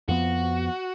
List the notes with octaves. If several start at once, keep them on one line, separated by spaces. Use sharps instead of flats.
F2 F3 B3 F#4